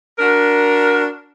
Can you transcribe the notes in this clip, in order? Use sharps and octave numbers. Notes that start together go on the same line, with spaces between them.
D4 F#4 A#4